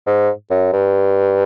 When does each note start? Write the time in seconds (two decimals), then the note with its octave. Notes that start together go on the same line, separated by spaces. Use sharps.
0.06 G#2
0.50 F#2
0.73 G2